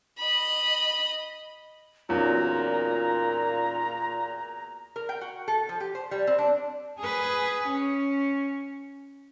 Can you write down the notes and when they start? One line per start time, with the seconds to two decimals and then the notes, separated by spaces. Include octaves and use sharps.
0.19 D#5 B5
2.09 E2 A#2 F#3 C#4 D#4 F4 A#5
4.96 A#4
5.09 G5
5.21 F#4
5.48 A4
5.69 F3
5.80 G4
5.95 C5
6.11 G3
6.27 C4
6.38 D4
6.99 G#4 B4
7.68 C#4